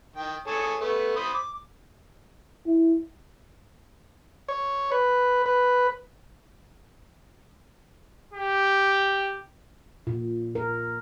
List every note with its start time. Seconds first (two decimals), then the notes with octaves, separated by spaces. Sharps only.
0.16 D#3 G5
0.47 G#4 A4 C#5
0.81 A3 B3
1.17 C5 B5 D#6
1.34 D6
2.66 E4
4.49 C#5
4.92 B4
5.46 B4
8.33 G4
10.07 A#2
10.55 A#4